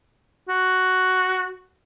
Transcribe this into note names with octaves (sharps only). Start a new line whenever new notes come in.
F#4